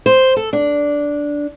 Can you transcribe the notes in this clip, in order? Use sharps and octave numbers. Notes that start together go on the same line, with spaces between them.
C5
A4
D4